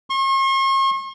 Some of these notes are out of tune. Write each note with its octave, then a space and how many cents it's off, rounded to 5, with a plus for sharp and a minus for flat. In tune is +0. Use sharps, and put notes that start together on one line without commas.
C#6 -45